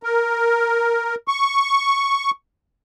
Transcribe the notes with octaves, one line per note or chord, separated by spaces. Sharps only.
A#4
C#6